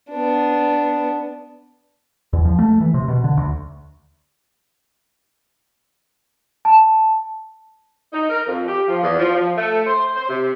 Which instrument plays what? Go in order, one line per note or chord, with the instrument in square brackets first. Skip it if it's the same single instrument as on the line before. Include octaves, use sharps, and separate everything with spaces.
[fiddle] B3 D4
[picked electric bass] E2
F3
A3
E3
C3
B2
D3
D2
[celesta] A5
[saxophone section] D#4
A#4
F2
G4
F3
E2
F3
F3
A3
C5
C5
C3